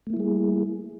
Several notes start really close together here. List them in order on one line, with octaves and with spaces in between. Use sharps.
A3 A#3 E4 G3 G#4